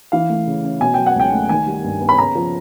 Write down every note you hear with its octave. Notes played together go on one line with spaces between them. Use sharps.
E3 F5
A3
C#3
C#4
B2 G#5
F#3 G5
F#5
C#2 G5
A3
D#3 G#5
G3
G2
B3
B5
C#3 A#5
F3